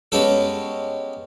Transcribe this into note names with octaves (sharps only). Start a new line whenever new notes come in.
G#3 B3 C#4 G4 A4